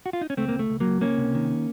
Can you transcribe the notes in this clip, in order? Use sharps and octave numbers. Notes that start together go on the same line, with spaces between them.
F#4
F4
D#4
C#4
C#2 A3 C4
A#3
C#2
A3
C#2
F#3 A#3
C#2
C#2 A#3 C#4
C3
D#3